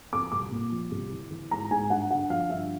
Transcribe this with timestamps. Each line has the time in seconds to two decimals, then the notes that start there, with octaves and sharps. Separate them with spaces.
0.12 F2 D6
0.32 C2 D6
0.51 A#2
0.72 F3
0.91 C2
1.12 E3
1.30 E3
1.51 G#2 A#5
1.70 G#2 G#5
1.90 G2 F#5
2.10 D3 F#5
2.30 F3 F5
2.50 G2 E5